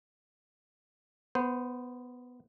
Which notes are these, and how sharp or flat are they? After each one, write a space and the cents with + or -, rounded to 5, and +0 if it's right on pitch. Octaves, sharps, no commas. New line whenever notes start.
B3 +5 C5 -20